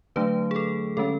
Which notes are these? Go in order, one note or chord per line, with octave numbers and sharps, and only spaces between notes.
D3 F#3 A3 D4 B4
G#4
A4
D3 G#3 C#4 A4